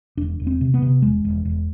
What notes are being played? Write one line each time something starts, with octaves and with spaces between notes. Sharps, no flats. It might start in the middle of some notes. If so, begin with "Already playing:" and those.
E1 D4
E1
C4
C3
B3
C3
E1 G#3
E1
E1